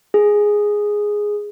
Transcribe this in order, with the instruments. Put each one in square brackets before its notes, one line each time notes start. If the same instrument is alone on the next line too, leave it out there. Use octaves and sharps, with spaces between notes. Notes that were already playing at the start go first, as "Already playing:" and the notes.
[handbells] G#4